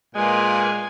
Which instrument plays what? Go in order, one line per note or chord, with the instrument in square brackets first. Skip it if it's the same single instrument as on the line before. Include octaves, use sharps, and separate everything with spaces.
[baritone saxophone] A#2 [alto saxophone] G#3 [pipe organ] A#3 A#4 B4 [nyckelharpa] G#5